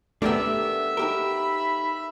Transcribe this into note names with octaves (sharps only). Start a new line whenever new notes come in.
A3 B3 D4 G4 A#4 E5
D#4 G4 A#4 B5